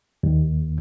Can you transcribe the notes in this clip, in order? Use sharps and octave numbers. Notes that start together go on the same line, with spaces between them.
D#2